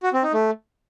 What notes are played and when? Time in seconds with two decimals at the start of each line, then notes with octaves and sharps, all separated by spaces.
0.03 F#4
0.13 C4
0.23 D#4
0.33 A3